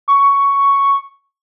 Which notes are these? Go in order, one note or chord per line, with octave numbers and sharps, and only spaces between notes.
C#6